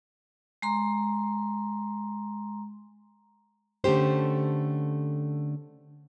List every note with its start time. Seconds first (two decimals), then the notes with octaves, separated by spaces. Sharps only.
0.62 G#3 A#5 C6
3.84 D3 A3 C#4 G4 C5